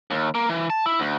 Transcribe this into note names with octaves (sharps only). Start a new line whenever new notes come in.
D#2
A#3
E3
A5
E4
D2